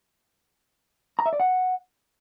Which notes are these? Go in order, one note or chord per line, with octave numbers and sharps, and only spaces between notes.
A#5
E5
D5
F#5